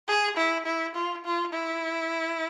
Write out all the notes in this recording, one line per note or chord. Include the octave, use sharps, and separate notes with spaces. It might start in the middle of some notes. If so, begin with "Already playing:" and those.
G#4
E4
E4
F4
F4
E4